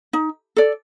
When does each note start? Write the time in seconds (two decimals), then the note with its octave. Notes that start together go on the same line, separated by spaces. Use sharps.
0.13 D#4
0.56 A4 D5